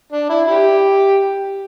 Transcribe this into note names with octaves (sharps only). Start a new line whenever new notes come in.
D4
E4
E4 G4